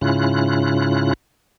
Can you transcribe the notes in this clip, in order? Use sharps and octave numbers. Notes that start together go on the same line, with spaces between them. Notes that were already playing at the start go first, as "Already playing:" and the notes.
G#2 C#3 C#4 E4 F4 F#6